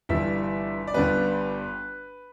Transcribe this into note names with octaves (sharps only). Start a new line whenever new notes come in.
G1 G2 E3 G3 E5
D5
G1 G2 G3 B3 B4